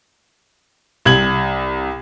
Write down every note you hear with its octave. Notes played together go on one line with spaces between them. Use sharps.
C2 G#6 F#7